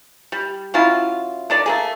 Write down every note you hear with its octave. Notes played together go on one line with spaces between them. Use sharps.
G3
F#3 C#4 E4 F4
D3 D4 D5
A3 A#3 G#4